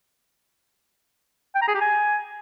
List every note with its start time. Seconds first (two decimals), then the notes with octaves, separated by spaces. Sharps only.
1.55 G5
1.61 A#5
1.68 G#4
1.74 G4
1.81 G#5